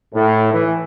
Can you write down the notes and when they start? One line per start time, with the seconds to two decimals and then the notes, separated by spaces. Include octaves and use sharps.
0.14 A2
0.52 E3